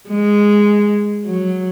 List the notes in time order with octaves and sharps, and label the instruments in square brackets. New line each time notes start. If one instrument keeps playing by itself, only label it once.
[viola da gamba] G#3
F#3